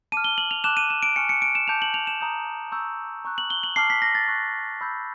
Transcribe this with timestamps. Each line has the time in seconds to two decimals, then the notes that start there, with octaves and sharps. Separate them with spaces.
0.12 A5 D6 F6 D#7
0.24 G7
0.38 F#7
0.51 F7
0.64 A5 D6 F#6 E7
0.77 D#7
0.90 E7
1.03 D7
1.16 G#5 C#6 F6 C#7
1.29 C#7
1.42 D7
1.55 E7
1.68 A5 D6 G6 F7
1.82 F#7
1.94 F7
2.07 E7
2.21 A#5 D#6 G6
2.72 A#5 C#6 E6 G6
3.25 A#5 C#6 F#6
3.38 F#7
3.50 G7
3.64 F#7
3.76 A5 D6 F6 C7
3.90 B6
4.02 A#6
4.15 A6
4.28 C#6 F#6
4.81 B5 E6 G6